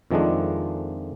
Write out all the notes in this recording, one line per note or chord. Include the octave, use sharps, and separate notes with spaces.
F2 D#3 F3 G#3 A3 D4